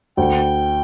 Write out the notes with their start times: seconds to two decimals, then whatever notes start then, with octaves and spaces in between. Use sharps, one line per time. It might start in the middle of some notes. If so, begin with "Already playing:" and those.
0.17 D2 G5